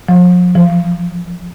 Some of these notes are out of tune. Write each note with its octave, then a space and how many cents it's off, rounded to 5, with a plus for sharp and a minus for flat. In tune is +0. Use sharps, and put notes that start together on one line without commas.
F3 +40
F3 -30